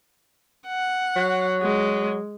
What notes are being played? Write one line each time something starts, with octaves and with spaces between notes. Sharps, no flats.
F#5
F#3
G#3